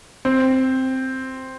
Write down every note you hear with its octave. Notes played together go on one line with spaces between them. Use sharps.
C4